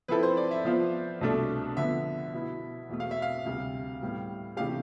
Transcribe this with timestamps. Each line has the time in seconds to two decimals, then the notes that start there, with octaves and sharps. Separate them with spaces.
0.08 F3 C4 E4 A4 B4
0.23 C5
0.37 D5
0.51 E5
0.65 F3 B3 F4 C5 F5
1.21 C2 B2 A3 D4 A4
1.77 D3 F3 B3 E5
2.33 B2 B3 E4
2.89 E2 B2 A3
3.00 F5
3.11 E5
3.22 F5
3.46 D2 C3 G3
4.01 A2 G3 B3
4.57 C3 E3 A3 D4 G4 F5